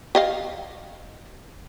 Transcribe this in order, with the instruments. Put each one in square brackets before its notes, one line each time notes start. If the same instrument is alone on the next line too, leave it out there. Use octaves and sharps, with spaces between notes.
[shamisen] G4 D#5 F5